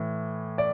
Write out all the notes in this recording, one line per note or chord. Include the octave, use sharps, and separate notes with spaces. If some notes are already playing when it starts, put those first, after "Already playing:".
Already playing: A2 E3
D5